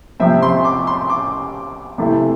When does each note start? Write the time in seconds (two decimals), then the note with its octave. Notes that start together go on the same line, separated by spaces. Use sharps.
0.20 C3 F3 C4 E5
0.42 C6
0.65 D6
0.87 C6
1.10 D6
1.98 C3 E3 A3